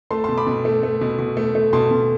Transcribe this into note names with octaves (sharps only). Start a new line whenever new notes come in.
A3 A5 C6
B2 A5 C6
B5 D6
B2
A3
A3
B2
B2
A3
A3
B2 A5 C6
B2